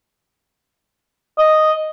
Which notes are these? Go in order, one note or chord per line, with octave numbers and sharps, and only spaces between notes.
D#5